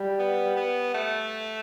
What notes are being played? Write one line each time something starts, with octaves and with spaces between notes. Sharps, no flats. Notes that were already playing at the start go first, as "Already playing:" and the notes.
Already playing: G3
B3
B3
A3